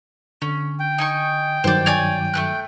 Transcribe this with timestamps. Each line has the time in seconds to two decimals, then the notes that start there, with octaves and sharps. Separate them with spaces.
0.42 D3 C#4
0.80 G5
0.98 D#4 G#5 C#6
1.64 G2 D#3 F#3 C5 D5
1.86 C#5 D5 G#5
2.34 A3 C4 F#6